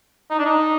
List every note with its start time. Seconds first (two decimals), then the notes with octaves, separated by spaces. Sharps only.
0.30 D#4
0.38 D4
0.45 D#4